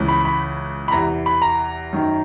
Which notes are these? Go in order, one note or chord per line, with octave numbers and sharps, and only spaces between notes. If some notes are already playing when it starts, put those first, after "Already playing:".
Already playing: C#2 C#3 E3
B5
B5
B5
E2 C3 E3 A#5
B5
A#5
F#2 D#3